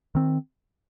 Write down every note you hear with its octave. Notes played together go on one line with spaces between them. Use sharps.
D#3 C4